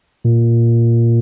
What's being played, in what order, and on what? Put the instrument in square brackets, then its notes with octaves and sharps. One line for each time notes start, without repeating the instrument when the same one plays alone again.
[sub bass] A#2